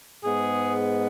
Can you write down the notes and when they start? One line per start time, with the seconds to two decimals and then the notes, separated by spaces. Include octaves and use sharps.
0.24 G#2 G#3 B3 G#4